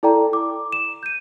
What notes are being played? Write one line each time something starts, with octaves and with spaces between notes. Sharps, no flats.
E4 A4 D5 G5 A#5
D6
E7
G6 D#7